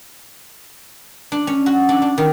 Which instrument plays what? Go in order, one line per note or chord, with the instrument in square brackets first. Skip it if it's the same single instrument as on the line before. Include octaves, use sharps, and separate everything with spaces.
[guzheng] D4
C#4
F#4
D4
D4
D#3